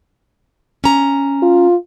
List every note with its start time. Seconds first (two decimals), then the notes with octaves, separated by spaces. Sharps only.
0.84 C#4 A#5
1.42 F4